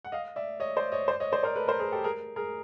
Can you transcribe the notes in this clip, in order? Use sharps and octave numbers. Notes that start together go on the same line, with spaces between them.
F#5
D#5 F5
D5 E5
C#5 D#5
C5 D5
C#5 D#5
C5 D5
C#5 D#5
C5 D5
A#4 C5
A4 B4
A#4 C5
G#4 A#4
G4 A4
G#4 A#4
G#4 A#4